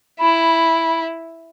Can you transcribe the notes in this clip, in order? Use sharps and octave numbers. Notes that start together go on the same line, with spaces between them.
E4 B5